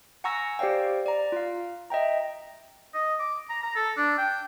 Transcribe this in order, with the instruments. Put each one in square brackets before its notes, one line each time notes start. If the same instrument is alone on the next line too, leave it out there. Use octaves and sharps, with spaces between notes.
[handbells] F#5 G#5 A#5 C#6 E6 A#6
G4 C5 D5 F5 G5
D5 A#5
F4 F5
D#5 E5 G5 A#5
[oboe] D#5
D6
A#5
A#5
A4
D4
G5